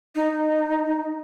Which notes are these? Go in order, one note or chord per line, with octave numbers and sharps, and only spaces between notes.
D#4